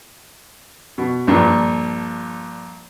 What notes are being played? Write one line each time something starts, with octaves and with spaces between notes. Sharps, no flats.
B2
A#1 G2 A#2